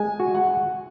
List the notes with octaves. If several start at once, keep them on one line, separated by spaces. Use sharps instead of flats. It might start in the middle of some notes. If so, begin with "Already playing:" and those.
Already playing: G#3 G#5
F#4
F#5